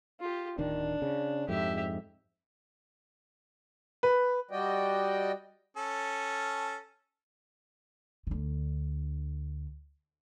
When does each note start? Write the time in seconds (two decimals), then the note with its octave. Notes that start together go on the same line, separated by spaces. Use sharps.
0.20 F4 G4
0.58 D1 D#3 D4
1.02 C#3
1.49 F2 G#2 G4 E5
4.03 B4
4.51 G3 F#4 D5 D#5 G5
5.77 C#4 A4
8.27 D2 D3